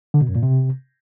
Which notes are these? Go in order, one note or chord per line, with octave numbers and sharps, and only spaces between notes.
D3
B2
F#2
A#2
C3